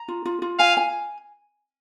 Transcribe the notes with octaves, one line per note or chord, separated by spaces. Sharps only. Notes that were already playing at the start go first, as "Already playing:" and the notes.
Already playing: A#5
F4
F4
F4
F5 G#5
G#5